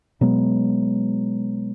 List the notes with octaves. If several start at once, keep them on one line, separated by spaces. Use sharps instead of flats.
B2 F#3 G#3 B3